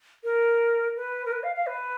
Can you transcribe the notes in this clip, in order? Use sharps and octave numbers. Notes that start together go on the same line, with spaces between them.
A#4
B4
A#4
B4
F5
F5
B4